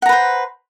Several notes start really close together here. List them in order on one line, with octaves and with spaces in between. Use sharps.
F#5 A#5 B4 C5